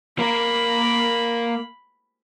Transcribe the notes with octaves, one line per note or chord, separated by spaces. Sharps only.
A#3 A#4 B5